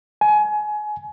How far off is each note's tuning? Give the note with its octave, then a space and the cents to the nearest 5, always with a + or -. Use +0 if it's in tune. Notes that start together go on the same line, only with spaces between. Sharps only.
G#5 +25